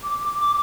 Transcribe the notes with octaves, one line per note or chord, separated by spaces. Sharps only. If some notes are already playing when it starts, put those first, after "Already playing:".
D6